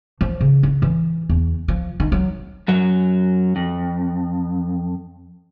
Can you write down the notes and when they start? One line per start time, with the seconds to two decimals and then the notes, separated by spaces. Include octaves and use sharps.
0.21 F3
0.41 C#3
0.63 E4
0.82 E3
1.29 E2
1.68 F3
2.00 D#3
2.12 F#3
2.68 F#2 F#3
3.56 F2